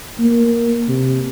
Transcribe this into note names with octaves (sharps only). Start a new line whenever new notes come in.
A#3
C3